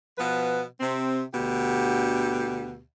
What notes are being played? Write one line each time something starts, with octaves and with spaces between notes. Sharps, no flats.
B2 F3 B3 B4
C3 C4
D2 B2 D3 G4